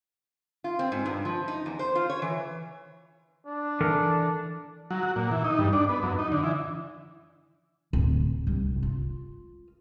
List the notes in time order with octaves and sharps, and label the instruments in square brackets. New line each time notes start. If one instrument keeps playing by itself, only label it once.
[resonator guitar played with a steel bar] F4
C4
G#2
G2
F3
D#4
E2
C5
F4
C#5
E3
[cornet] D4
[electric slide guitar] E3 A4 A#4
[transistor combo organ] F#3
F#4
A#2
E3
D#4
G2
D4
B3
F#2
D#4
D3
E3
[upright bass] D1
C2 G2
F4